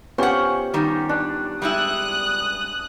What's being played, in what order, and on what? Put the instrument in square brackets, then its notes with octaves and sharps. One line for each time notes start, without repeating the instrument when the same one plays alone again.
[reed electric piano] B3 F4 G4 [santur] C#4 C#5 [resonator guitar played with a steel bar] C5 F#5
[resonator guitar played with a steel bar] D#3 G3
[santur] D4
[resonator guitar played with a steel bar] G3 G#3 E4 [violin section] D#6 F#6